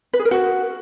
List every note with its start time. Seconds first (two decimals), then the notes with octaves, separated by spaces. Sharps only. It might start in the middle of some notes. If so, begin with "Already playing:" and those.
0.13 B4
0.19 G#4
0.25 A#4
0.31 F#4